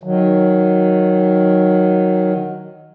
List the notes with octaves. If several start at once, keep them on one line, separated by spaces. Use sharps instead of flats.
D#3 F#3